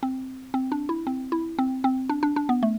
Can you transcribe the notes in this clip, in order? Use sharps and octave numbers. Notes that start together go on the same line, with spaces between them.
C4
C4
D4
E4
C4
E4
C4
C4
D4
D4
D4
B3
A3